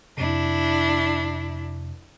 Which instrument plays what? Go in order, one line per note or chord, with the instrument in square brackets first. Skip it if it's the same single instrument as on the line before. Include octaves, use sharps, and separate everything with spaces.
[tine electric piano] F2 C3 [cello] D4 E4